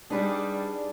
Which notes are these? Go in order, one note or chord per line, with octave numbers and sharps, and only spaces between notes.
G3 D4 D#4 G#4 B4 D5